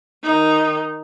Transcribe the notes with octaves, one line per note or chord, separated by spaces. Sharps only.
D#3 D#4